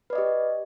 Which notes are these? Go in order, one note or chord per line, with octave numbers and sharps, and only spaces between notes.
G4 B4 D5 D#5